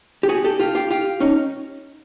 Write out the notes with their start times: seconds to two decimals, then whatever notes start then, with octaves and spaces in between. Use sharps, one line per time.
0.23 G4
0.29 F#4 G#4
0.44 G4 A4
0.60 F4 G4
0.75 F4 G4
0.90 F4 G4
1.20 C#4 D#4